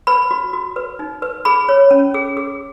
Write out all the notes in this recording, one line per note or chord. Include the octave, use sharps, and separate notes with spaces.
B4 B5
F#4
F#4
B4
D#4
B4
G#4 B5
C#5
C#4
G#4
G#4